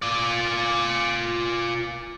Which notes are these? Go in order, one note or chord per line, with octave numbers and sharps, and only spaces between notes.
F4 D5